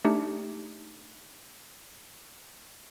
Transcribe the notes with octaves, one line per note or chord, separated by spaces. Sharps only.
A3 D4 D#4 G4